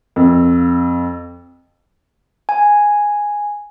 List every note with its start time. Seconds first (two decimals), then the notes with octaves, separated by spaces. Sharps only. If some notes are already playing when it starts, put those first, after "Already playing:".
0.16 F2
2.49 G#5